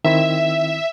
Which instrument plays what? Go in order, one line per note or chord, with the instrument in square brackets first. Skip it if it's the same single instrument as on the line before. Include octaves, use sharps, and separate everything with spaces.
[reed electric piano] D#3 C4 E4 [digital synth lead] E5